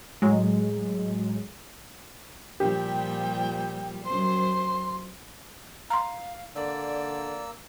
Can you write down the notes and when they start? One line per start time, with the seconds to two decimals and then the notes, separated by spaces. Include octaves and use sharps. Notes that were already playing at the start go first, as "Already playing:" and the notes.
0.22 A2 F#3 G#3
2.60 A#2 F3 G3 G4 G5
4.04 F#2 C5 C6
5.90 F5 A#5 C6
6.56 D3 A#3 D5 E6